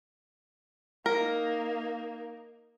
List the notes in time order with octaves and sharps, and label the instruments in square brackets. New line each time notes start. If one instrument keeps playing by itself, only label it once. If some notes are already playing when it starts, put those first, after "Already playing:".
[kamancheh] A#3 D#4 [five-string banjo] A#4